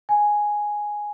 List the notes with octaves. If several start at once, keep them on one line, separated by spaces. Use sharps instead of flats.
G#5